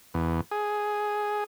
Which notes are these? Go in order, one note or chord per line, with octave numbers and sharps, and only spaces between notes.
E2
G#4